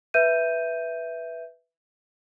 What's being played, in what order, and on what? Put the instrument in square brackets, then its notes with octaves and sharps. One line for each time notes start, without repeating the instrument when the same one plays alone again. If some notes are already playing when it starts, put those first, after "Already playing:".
[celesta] B4 E5 G6 D#7